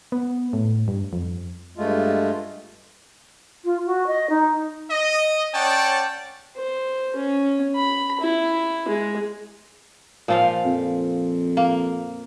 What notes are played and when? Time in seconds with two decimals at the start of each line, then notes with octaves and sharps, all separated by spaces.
0.12 B3
0.53 A2
0.88 G2
1.13 F2
1.75 G2 G#3 A3 F4
3.65 F4
3.86 F#4
4.07 D#5
4.30 D#4
4.91 D#5
5.54 C#4 C#5 D5 F#5 G5 A5
6.57 C5
7.16 C#4
7.76 B5
8.21 E4
8.88 G#3
10.28 A#2 F3 F5
10.65 F2
11.57 A#3